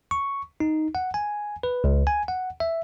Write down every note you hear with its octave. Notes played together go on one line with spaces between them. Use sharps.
C#6
D#4
F#5
G#5
B4
C#2
G#5
F#5
E5